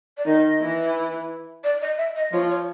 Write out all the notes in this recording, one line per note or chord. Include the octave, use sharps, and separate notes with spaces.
D5
D#3 D#4 D#5
E3 E4
D5
D#5
E5
D#5
F3 F4 C#5
C#5